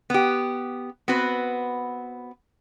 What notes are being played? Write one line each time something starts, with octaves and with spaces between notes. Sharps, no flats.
B3 G4
B3 C4 F#4 B4